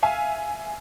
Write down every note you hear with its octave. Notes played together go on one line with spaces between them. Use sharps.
E5 F5 G#5